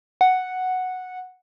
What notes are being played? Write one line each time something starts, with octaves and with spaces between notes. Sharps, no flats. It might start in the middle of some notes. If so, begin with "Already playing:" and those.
F#5